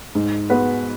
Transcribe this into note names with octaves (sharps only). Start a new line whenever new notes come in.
G#2
G#3 B3 F#4 B4